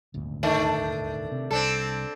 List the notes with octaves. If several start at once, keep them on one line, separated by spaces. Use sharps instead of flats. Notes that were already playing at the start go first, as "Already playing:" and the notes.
D#1 G#1 D2
D#3 A3 D4
C3
C2 C4 D4 A4